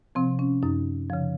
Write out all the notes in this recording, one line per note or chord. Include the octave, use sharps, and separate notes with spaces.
C3 F3 C4
C#4
F#2 D#4
C#3 F3